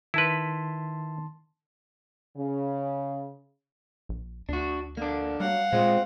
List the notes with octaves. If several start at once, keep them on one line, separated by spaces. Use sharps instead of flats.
D#3 E4 B4 A5 C6
C#3
A#1
D2 D4 F#4
D3 A#3 D4
F#3 G3 F5 F#5
A#2 G#3 C4 F4